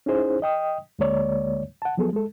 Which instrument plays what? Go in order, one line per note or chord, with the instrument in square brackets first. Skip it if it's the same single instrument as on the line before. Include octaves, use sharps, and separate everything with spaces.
[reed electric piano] C#4 D#4 E4 G#4 C5
D#5 G5 D#6
D2 D3 G#3 A#3 C#5 D5
F#5 A5
F3 F#3 B3 G#4 A4
G#3 A4